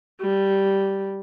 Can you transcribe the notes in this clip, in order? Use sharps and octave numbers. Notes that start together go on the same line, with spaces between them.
G3